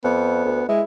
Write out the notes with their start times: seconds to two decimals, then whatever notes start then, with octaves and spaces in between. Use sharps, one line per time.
0.04 F2 B3
0.45 D2
0.69 G#3 E4